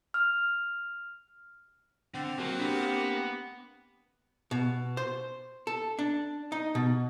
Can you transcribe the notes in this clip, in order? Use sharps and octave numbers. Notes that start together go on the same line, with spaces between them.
F6
D3 C4
F#3 A#3
B3 D4 G4
B2
C5
A4
D4
D#4
B2